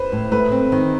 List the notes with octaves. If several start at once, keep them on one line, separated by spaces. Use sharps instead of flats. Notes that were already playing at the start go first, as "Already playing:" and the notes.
Already playing: B4 C5
A2
A3 B4
C4
D#3